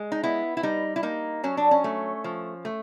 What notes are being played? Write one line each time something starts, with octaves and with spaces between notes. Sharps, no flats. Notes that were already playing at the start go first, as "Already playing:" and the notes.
Already playing: G#3
D#4
B3 E4
E4
G3 D#4
E4
A#3 D#4
F#3 C#4
D4
C#4
A3
F3
A3